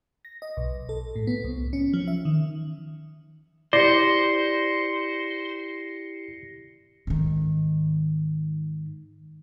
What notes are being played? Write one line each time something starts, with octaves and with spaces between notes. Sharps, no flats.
A#6
D#5
B1
A4
A2
B3
C2
C#4
F3
E5
D#3
E4 G4 C5 D5 A#6 C7 C#7
G#2 D#3